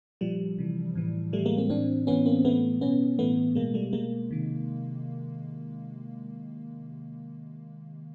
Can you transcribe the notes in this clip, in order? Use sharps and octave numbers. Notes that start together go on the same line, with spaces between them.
A#2 F3 G3
C3 E3
A2 E3
A2 E3 G3 A3
G#3 A#3
A#3 C4
A2 E3 C4 D4
A2 E3 B3 C#4
A#3 C4
A2 E3 A3 B3
B2 B3 C#4
A2 E3 A3 B3
B2 G#3 A#3
G3 A3
B2 G#3 A#3
C3 D#3